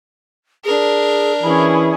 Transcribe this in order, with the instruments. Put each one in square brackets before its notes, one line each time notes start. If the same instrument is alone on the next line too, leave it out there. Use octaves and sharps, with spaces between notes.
[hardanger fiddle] D4 A#4 [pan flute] G#4
[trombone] E3 [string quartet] C#4 E4 G#4 [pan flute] B5